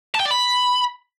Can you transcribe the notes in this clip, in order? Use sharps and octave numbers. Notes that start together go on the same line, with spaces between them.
A5
G5
D5
B5